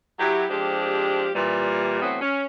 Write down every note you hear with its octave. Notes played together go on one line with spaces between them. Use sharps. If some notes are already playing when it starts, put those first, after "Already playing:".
F#3 E4 G4
F3 G#3 C4 D4 G4
A#2 E3 G3
A2 E3 F#3 B3 C4 F#4
C#4